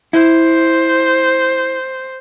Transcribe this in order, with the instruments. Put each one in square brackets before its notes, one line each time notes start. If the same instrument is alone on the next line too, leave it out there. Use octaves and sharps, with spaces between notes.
[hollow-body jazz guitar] E4 [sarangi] C5